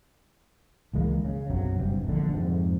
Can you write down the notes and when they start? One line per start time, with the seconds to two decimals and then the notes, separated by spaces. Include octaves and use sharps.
0.94 C#2 E3 G#3 A#3
1.25 C#3
1.50 B1 F#2 C3 F#3
1.79 F#1 G2 C3
2.05 E1 A#1 D3
2.33 F2 G#2 C3